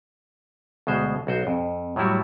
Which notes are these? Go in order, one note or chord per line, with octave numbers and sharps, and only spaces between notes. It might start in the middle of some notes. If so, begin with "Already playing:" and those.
D2 B2 G#3 C5
B1 F#4 C5
F2
A2 F#3 G3 E4 F#4